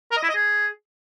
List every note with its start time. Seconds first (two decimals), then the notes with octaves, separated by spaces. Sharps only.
0.11 A#4
0.17 D#5
0.23 E4
0.29 D#5
0.35 G#4